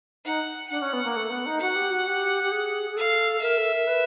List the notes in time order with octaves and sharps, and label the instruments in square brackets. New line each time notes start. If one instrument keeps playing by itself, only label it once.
[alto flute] D#4 [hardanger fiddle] F#5
[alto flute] D4 [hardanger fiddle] F#5
[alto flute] C#4
B3
A#3
A3
B3
D#4
[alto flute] F#4 [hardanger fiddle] F#5
[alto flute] G4
F#4
G4
G4
G#4
G#4
[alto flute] A4 [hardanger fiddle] F5
[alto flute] A#4 [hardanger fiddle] E5
[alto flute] A4
A#4
B4